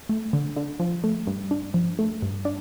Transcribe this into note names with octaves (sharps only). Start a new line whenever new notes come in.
A3
D3
D3
F3
A3
G2
D4
F3
A3
G2
D4